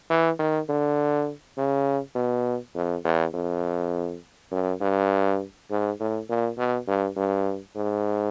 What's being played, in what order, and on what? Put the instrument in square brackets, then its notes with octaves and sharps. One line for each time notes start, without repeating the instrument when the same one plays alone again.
[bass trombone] E3
D#3
D3
C#3
B2
F2
E2
F2
F#2
G2
G#2
A2
A#2
B2
G2
G2
G#2